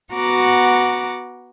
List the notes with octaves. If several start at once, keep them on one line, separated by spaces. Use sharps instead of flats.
B3 F#4 F#5 A#5 D6